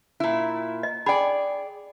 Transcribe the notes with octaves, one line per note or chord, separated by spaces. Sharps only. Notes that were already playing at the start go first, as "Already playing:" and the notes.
A#2 E4
D#5
G#4 D5 G5 B5